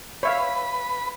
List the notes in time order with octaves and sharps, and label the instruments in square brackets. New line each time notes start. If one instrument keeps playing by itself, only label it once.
[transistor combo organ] B4 B5 [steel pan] C#5 E5 F5